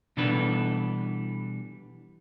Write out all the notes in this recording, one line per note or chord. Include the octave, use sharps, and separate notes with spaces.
B2 E3 G3 D4 A4 B4